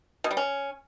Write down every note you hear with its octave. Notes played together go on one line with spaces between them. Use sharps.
B2
G3
C#4